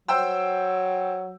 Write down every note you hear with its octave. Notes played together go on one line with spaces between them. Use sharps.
F#3 C5 G5 E6